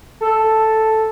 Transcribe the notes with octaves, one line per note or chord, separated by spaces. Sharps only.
A4